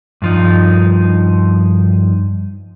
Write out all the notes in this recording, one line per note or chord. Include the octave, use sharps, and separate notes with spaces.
G2 F3 D#4